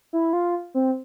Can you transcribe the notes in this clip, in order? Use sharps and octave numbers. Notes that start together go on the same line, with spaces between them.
E4
F4
C4